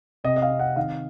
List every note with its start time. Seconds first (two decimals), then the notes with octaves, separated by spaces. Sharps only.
0.24 C3 D#5
0.36 D#5
0.42 F5
0.51 C4
0.59 F#5
0.76 D#3 F5